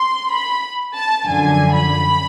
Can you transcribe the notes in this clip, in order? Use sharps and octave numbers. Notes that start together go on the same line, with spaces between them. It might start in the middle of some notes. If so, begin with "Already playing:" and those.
Already playing: C6
B5
A5
F#2 D3 F3 G#5
B5